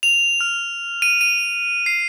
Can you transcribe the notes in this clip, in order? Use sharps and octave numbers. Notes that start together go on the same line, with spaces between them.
F7
F6
D#7
D#7
C7